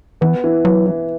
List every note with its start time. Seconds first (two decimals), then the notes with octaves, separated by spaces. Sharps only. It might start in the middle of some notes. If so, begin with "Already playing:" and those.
0.21 E3 B3
0.44 E3
0.65 E3 F#3
0.87 E3